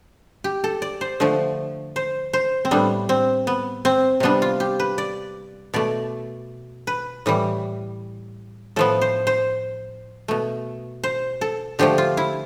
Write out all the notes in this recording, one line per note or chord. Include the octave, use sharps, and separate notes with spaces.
G4
A4
D5
C5
D3 F3 A3
C5
C5
C4
A2 G3 B3 D4
C4
B3
C4
C3 G3 B3 D4
F4
G4
B4
D5
B2 A3 D5
B4
A2 E3 G3
A2 F3 B3 A4
C5
C5
B2 A3
C5
A4
D3 F3 A3 G4
F4
E4